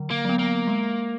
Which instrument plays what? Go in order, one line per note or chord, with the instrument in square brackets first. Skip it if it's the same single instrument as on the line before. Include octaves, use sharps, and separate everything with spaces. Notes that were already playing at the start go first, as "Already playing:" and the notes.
Already playing: [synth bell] D3 F#3
[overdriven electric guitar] A#3
[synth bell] F#3 B3
[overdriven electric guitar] A#3
[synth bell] G#3